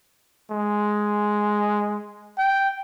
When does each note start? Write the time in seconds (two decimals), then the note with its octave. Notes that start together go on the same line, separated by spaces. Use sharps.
0.51 G#3
2.38 G5